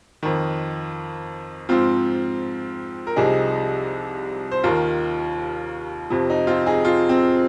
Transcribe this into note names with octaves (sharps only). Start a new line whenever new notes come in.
F2 D#3
G#2 F3 C4 F4
A#4
C2 C3 F3 D#4 G#4
C5
D#2 D#3 F4 A#4
F2 C3 F3
D#4
C4 F4
D#4 G#4
C4 F4
C4